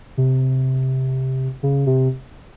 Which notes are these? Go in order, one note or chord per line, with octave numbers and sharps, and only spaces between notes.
C3
C#3
C3